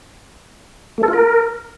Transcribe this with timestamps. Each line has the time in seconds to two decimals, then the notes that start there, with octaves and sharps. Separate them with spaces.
0.98 A3
1.03 A4
1.08 F4
1.13 A#4